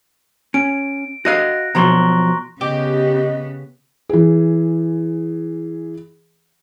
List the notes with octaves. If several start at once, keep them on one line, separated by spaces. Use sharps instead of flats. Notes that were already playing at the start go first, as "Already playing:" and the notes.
C#4 D7
F#4 D#5 F5 F#6 A#6
B2 F3 F#3 A#5 C6 C#6
C#3 B3 G4 D#5
E3 G#4